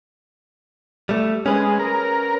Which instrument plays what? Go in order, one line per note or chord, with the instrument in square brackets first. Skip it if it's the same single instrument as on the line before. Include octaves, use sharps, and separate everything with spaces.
[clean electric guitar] G3 A3
[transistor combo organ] G#3 [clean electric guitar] C#4 B4
[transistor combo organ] A#4